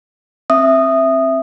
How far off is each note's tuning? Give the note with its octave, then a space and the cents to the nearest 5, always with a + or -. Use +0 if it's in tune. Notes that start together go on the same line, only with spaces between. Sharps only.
C4 +20 E5 +0 D#6 -10